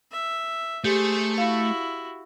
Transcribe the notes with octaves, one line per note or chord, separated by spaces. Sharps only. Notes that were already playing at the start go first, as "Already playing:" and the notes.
E5
A3 G4 G#4 C5
E4 F#4 F5